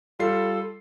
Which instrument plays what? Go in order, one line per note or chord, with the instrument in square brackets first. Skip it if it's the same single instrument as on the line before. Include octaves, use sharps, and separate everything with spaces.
[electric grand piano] G3 F4 C7 [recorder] A4